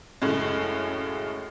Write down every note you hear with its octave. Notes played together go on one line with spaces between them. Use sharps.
F#2 A2 C#3 G#3